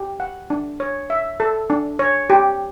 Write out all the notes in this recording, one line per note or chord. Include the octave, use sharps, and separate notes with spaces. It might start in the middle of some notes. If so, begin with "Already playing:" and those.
Already playing: G4
F#5
D4
C#5
E5
A4
D4
C#5
G4